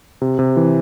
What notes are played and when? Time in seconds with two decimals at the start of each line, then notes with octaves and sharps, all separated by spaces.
0.22 C3
0.39 C3
0.57 E3